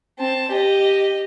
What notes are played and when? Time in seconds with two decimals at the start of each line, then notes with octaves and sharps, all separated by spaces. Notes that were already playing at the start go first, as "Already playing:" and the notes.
0.19 C4 A5
0.51 G4 D#5